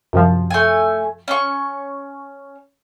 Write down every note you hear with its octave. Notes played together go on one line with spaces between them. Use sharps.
F#2 C3 F3
A3 G#5
C#4 C#6